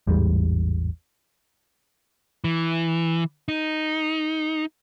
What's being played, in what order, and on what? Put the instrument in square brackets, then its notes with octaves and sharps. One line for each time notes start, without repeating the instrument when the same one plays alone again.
[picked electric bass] A1 E2 G#2 G3
[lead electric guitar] E3
D#4